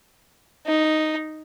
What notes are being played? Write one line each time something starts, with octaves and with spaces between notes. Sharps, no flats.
D#4